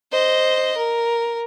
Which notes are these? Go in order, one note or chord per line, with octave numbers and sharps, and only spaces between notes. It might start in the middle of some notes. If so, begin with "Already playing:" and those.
C5 D#5
A#4